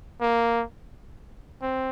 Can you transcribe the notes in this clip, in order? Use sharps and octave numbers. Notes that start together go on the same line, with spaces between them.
A#3
C4